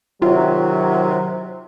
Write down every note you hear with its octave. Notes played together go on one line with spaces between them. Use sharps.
C3 D#3 F#3 F4